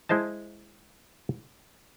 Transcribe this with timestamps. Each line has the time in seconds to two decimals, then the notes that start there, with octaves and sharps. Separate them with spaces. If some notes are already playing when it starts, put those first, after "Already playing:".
0.09 G#3 E4 C5 D#5 A5